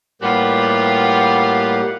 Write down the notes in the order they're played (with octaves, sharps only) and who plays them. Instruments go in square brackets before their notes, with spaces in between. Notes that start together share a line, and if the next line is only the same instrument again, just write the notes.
[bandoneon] A2 G3 G4 [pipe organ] A#3 F#5 [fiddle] B3 F4